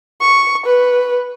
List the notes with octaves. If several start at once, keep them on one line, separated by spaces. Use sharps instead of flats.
C#6
B4